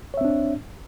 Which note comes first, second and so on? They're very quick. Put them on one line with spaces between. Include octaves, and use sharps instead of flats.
C#5 E5 C4 D4